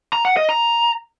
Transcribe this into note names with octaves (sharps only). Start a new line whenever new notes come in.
A#5
F#5
D#5
A#5